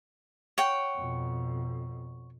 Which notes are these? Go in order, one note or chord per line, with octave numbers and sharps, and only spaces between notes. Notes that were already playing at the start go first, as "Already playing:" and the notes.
C#5 F#5 G5
F2 B2